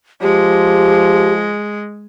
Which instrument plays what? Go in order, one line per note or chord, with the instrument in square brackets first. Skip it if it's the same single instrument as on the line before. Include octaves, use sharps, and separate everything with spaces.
[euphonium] F3 [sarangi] G#3 [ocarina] G4